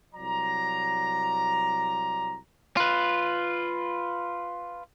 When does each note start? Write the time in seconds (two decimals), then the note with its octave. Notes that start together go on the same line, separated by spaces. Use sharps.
0.15 C2 F#3 D5 A#5
2.77 F4 B4